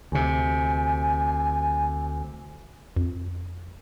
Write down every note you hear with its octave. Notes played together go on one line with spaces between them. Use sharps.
D2 C3 G#5
F2